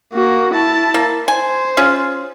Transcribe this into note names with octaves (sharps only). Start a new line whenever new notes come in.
A#3 F#4
E4 A5
A#3
C5 G#5
C#4 F4 G#4